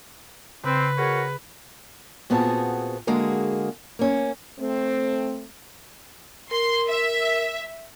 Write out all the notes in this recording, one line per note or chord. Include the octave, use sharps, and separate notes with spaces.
C#3 C4 B4
F#4 G#4 A#4 C#5
A#2 B3 C4 F#4 G#4 A5
D3 G#3 A#3 F#4 G#4
A#3 C#4
A3 C4
A#4 C6
E5